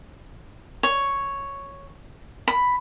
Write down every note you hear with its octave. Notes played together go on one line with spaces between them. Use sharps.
C#5
B5